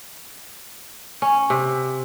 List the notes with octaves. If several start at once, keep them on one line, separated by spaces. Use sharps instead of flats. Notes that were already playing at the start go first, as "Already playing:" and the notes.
C#4
C3